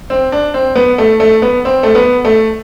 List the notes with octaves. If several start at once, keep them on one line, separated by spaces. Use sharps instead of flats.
C4
D4
C4
B3
A3
A3
B3
C4
A3
B3
A3